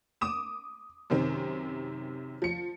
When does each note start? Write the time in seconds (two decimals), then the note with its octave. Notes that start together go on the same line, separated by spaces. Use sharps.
0.21 D6 D#6 E7
1.10 F#2 C3 D#3 C4
2.42 F3 C#7